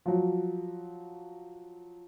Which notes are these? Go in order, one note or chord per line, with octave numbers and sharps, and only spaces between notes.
F3 F#3